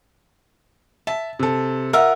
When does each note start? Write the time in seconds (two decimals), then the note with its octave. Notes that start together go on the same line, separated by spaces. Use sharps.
1.07 E5 A5
1.39 C3 A4
1.93 F4 A#4 E5 F#5